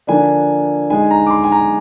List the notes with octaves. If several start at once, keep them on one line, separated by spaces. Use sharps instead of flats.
D3 F3 A#3 D4 G#5
D3 G#3 D#4 G#5
A#5
D6
C6
G#5
A#5